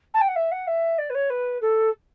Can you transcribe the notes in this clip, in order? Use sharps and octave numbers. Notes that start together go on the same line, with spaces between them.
A5
G5
F#5
E5
F#5
E5
D5
B4
C#5
B4
A4